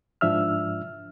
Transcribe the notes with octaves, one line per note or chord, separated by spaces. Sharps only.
G#2 F3 D4 E5 E6 F6